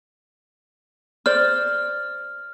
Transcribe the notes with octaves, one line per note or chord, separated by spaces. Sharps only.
C5 D5 F6